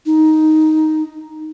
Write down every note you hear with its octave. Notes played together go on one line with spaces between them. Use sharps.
D#4